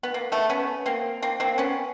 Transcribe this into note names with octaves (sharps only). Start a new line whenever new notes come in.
B3
A#3
A3 B3
B3 C#4
A#3 C4
A#3 C4
A#3 C4
B3 C#4